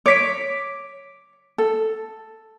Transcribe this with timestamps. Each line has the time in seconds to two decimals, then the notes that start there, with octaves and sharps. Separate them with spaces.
0.06 C#5 D6 B6 D7
1.58 A4